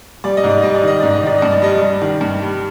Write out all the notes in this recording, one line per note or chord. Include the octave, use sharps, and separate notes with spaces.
G3 D5
D#5
G#2
D5
G3 D#5
D5
D#3 D#5
G#2 D5
D#5
D#3 D5
G2 D#5
D5
G3 D#5
G3 D5
D#3
G2
G3